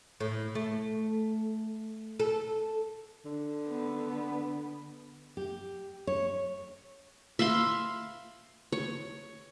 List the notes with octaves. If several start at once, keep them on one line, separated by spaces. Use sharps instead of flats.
A2
A3
A4
D3
B3
G4
C#5
E5 F5 B5 C6
C#5